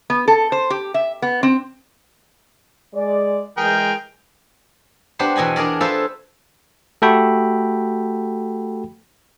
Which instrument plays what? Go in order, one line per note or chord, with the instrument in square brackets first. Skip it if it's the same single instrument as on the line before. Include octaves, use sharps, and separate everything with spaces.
[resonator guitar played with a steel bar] B3
A4
C5
G4
E5
B3
C4
[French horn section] G#3 D5
[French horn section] E3 G#3 [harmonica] G#4 A#4 G5
[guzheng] B3 D4 G4 B4 C5
E2 B2 D#5 G#5 B5
D4 G#4 A#4 D5
F4 G#4 A4 B4 C5 E5
[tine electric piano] A3 F#4 G4 A4 G5 B5